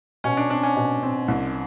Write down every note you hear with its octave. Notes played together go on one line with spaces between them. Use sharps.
B2 C#4
D4
C4 D4
C#4
B2
C4
C2